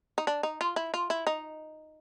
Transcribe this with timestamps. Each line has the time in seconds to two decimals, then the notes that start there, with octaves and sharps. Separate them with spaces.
0.18 D#4
0.27 D4
0.43 D#4
0.61 F4
0.76 E4
0.94 F4
1.10 E4
1.27 D#4